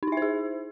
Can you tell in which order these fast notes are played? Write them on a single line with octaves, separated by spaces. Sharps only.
D#4 E4 E5 C5 G#4